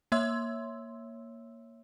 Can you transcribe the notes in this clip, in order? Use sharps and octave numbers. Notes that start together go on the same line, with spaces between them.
A#3 C#5 E5 C6 E6